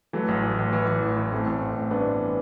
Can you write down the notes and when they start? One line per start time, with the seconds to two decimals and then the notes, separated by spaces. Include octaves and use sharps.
0.13 E3 F#3 A3
0.28 A1
0.43 A1
0.59 A1
0.73 E3
0.88 E3
1.02 A1
1.17 E3
1.32 A1 A3 C4
1.47 A1
1.61 A1
1.76 A1
1.91 G2 B3 D4
2.05 E3